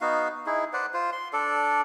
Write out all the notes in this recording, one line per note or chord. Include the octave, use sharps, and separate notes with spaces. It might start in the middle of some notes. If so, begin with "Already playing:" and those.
B3 D#4 F#4 F5
D#4 E4 G#4
B4 C5 D5 F#5
F4 C5
C6
D4 A4 D5